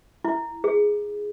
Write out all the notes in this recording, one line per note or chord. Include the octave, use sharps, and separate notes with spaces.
E4
G#4